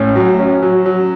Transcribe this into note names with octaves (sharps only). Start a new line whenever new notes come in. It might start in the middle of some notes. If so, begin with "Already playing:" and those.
Already playing: A2 C#4
F#3
C#4
F#3
F#3